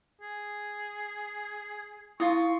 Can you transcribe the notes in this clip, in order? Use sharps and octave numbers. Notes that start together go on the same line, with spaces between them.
G#4
E4 F4 C#6 D#6